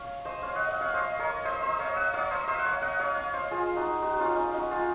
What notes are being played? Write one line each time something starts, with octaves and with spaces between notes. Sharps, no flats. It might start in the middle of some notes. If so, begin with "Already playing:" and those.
Already playing: C#5 F5
C5 D#5
C#5 F5
D#5 F#5
D#5 F#5
C#5 F5
C5 D#5
A#4 C#5
C5 D#5
C5 D#5
C#5 F5
D#5 F#5
C#5 F5
C5 D#5
C5 D#5
F#5
C#5 F5
D#5 F#5
C#5 F5
C#5 F5
C5 D#5
F4 G#4
D#4 F#4
D#4 F#4
C#4 F4
D#4
D#4 F#4
F4 G#4